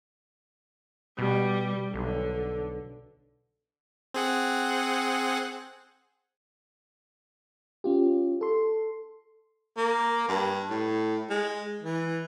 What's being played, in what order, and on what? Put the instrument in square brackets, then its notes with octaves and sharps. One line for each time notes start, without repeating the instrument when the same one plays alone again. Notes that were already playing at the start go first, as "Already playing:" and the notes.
[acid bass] B2 [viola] G3
[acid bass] B1 [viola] D3
[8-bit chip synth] C4 G#4 F#5
[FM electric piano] C#4 F4 G4
A4 C6
[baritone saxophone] A#3
G2
A2
G#3
E3